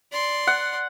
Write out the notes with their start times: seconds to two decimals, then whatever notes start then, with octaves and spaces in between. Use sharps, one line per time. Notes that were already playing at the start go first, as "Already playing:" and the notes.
0.12 D5 C6
0.47 F#5